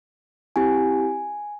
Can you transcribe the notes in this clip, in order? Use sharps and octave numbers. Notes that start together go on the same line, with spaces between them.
C4 E4 G4 G#5